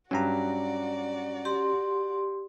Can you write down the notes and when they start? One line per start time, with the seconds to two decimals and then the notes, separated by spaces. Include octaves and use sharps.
0.11 G2 F#3 C#4 F#4 D5 A#5
1.45 G4 C6